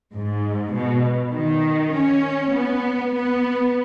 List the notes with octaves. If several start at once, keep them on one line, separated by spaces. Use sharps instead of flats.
G#2
B2
D#3
C#4
B3
B3